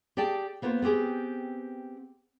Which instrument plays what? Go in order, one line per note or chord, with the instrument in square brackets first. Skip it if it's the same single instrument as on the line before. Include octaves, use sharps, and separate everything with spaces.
[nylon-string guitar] G4 G#4 D5 G5 A5
A#3 B3 F4 A#4 C5
B3 C4 G4 G#4